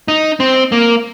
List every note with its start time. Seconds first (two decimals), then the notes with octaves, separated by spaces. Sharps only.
0.08 D#4
0.40 C4
0.72 A#3